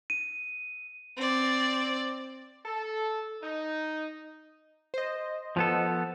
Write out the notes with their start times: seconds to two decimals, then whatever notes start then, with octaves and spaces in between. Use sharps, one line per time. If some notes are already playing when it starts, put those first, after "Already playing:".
0.10 D#7
1.17 C4 D5
2.64 A4
3.42 D#4
4.94 C5 D#5
5.57 F3 B3 A4